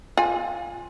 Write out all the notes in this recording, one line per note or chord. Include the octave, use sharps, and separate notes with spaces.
F4 G#5